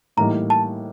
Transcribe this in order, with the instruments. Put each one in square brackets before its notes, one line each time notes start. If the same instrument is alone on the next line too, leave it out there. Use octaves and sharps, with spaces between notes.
[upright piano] A2 E3 G3 A#3 D#4 [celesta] A#5
[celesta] A5